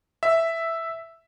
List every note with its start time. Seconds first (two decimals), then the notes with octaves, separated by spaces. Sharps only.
0.23 E5